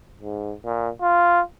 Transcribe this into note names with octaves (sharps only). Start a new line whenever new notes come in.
G#2
A#2
F4